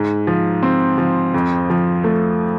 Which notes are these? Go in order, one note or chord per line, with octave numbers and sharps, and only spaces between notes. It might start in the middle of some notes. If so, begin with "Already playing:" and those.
Already playing: G#2
F3
C4
F3
F2
F3
A3